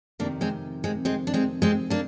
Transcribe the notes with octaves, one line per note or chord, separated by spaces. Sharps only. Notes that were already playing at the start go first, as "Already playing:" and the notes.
F2 C3 D#3 A#3 D4
G#3 C4
G#3 C4
G#3 C4
D4
G#3 C4
G#3 C4
A#3 D4